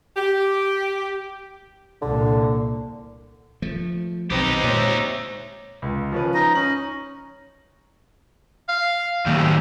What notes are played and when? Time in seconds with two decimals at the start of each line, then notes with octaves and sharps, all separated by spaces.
0.17 G4
2.02 C2 A#2 D3
3.62 F3 A3
4.30 B1 D#3 C4 D#4 G4 B4
4.63 A#2 G#3 C5 C#5 E5
5.82 C#2
6.12 F3 C#4 B4
6.34 D#4 D#5
6.55 C#4 F#7
8.69 F5
9.26 D#2 A2 G4